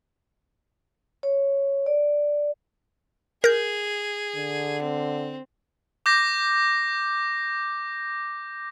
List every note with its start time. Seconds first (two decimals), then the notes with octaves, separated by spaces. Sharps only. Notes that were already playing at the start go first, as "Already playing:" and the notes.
1.23 C#5
1.86 D5
3.44 G#4 A#4 G6
4.35 D3
4.82 C4
6.06 D6 G6 A#6